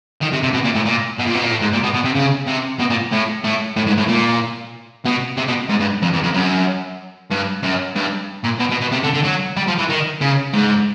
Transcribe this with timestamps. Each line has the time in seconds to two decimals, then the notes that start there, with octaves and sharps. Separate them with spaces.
0.21 D#3
0.32 C3
0.43 C3
0.54 B2
0.64 A#2
0.75 A2
0.86 A#2
1.18 B2
1.26 A#2
1.34 B2
1.42 A#2
1.50 A2
1.61 G#2
1.72 A#2
1.83 B2
1.93 B2
2.04 C3
2.15 C#3
2.47 C3
2.79 B2
2.90 A#2
3.12 A2
3.44 A2
3.76 A2
3.87 G#2
3.98 A2
4.08 A#2
5.05 B2
5.37 C3
5.48 B2
5.69 G#2
5.80 G2
6.02 F2
6.13 E2
6.23 F2
6.34 F#2
7.31 G2
7.63 F#2
7.96 G2
8.44 A#2
8.59 B2
8.71 B2
8.81 B2
8.92 C3
9.03 D3
9.14 D3
9.24 F#3
9.57 G3
9.68 F3
9.78 E3
9.89 D#3
10.21 C#3
10.53 G#2